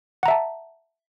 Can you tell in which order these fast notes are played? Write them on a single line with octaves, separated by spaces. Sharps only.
F#5 A#5 E5 A5